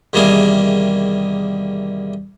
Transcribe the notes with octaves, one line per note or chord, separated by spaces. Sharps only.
E2 C3 D#3 G3 A#3 G#4